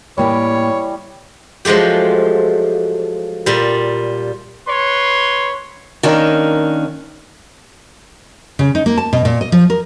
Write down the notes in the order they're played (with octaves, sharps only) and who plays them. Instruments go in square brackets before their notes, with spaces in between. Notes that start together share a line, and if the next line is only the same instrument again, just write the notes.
[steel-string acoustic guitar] A2 A#3 G4 [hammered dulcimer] E3 G3 [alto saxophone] C#5
[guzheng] F3 F#3 G#3 A3 G4
A#2 G3
[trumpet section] B4 C#5 C6
[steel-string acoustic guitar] D#3 A#3 C#4 D4
[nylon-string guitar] C#3
D#4
A#3
A5
B2
A#2
D#5
F3
A#4